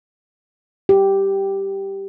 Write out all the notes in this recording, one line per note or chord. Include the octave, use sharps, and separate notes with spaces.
G4